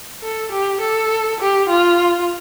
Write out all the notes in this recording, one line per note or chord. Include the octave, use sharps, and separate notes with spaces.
A4
G4
A4
G4
F4